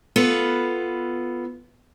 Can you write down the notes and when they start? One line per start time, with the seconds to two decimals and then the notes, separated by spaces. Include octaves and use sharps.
0.16 B3 F4 A4 B4